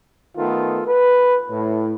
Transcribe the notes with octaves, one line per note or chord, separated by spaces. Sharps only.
D#3 A3 B3 F4 A4
B4
A2